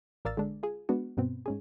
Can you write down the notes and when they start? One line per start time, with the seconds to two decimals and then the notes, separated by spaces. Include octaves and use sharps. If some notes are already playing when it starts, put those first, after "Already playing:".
0.25 A1 A#4 D5 F5 E6 A6
0.37 D3 G#3 D4
0.63 F4 G#4
0.89 G#3 B3 D4 F#4
1.17 G2 B2 B3 C4
1.46 G#2 C#4 G#4